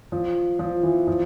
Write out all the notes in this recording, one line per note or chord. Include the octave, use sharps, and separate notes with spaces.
F3
F3
E3
F3